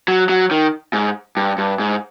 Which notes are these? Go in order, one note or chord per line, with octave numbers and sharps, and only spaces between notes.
F#3
F#3
D#3
G#2
G2
G2
G#2